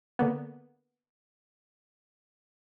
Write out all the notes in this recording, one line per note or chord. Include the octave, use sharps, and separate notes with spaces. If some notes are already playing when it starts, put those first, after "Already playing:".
D3 A#3 B3